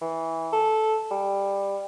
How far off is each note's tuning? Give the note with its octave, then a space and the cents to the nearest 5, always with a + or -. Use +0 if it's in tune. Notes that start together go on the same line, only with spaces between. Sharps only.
E3 -15
A4 -10
G3 +15